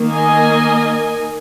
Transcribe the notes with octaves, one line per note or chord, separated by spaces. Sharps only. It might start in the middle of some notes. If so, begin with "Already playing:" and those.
Already playing: D#3 A#3
D#5 G#5